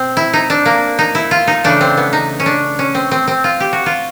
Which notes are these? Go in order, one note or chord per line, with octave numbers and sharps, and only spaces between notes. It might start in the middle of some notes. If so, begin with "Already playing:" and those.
Already playing: B2 C4
E4
D#4
D4
A#3
D#4
E4
F4
D#4
C#3 E3 A3 D4
C4
B3
D#4
C#4
D4
C#4
C4
C4
C4
F4
G4
F#4
F4